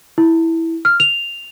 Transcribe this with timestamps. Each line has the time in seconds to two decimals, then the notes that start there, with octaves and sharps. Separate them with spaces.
0.18 E4
0.85 F6
1.00 F7